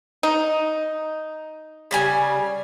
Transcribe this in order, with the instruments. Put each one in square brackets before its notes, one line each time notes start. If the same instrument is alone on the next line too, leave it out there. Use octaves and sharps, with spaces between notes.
[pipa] D#4
[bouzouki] C#3 G3 G#5